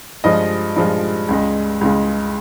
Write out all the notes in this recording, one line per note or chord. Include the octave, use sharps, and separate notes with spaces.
G2 F3 G#3 D#5
G2 F3 G#3
C#2 C#3 G#3
C#2 C#3 G#3